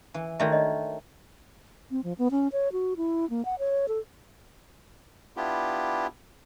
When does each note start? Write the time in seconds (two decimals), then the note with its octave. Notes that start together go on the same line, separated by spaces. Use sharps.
0.14 E3
0.40 D#3 A3 F#4 D5 E5
0.52 D4 C#5 D#5
1.91 C4
2.04 F3
2.19 B3
2.31 C#4
2.52 C#5
2.72 F#4
2.97 E4
3.30 A#3
3.45 F#5
3.59 C#5
3.88 A4
5.37 B3 D4 E4 F4 G4